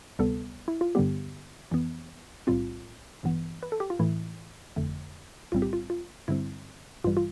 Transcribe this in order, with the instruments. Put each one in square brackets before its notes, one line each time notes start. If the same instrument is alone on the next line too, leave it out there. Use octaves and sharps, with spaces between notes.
[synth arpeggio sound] D2 C3 G3 B3 A4
E4
F4
G2 D3 G3 B3 G4
F2 E3 B3
B1 A2 G3 C4 F4
A1 G2 E3 B3
B4
A4
G4
F4
A2 E3 A3 E4
G1 F2 D3 A3
B1 A2 G3 C4 F4
G4
F4
F4
G2 D3 G3 C4 E4
A1 G2 E3 G3 F4
F4